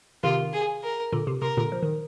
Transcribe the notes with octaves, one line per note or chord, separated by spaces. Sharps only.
C3 D#3 F4
G#4
A#4
A#2 D3
C3
C3 A#4
A#2 D3
F3
D#3